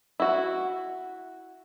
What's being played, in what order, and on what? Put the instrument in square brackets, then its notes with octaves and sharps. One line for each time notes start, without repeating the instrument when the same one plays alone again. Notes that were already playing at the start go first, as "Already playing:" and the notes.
[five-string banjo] E4 F#4